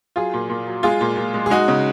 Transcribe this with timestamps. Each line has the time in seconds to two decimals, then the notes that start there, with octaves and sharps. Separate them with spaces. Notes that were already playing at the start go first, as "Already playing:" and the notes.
0.16 F#3 F4 G#4
0.34 A#2
0.50 A#2
0.66 F#3
0.83 G#3 F4 G#4
1.01 A#2
1.17 A#2
1.34 G#3
1.46 G#4
1.50 G#3 D#4 F#4
1.68 C#3